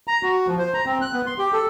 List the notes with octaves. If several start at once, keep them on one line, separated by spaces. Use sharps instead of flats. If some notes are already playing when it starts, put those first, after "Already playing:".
A#5
F#4
F3
C5
A#5
C4
F#6
B3
C6
G4
A4